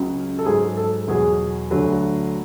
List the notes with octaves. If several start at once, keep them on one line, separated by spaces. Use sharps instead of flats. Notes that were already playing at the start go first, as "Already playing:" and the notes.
Already playing: C#2 C#3 F#3
A4
G#2 F#3 G#4
A4
E2 B2 F#3 G#4
D2 D3 F#3